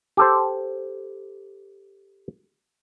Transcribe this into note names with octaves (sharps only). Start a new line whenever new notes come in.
G4 A4 C5